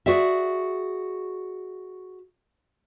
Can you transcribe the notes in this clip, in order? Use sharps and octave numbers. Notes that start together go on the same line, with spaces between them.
F#4 G#4 D5 E5